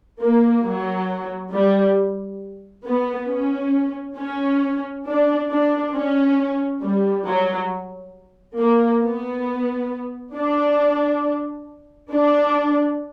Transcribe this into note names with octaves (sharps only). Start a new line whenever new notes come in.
A#3
F#3
G3
B3
C#4
C#4
D4
D4
C#4
G3
F#3
A#3
B3
D4
D4